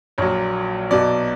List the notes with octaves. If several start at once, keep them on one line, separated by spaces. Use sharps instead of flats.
A#1 A#2 F#3 C#5
B1 B2 F#3 D5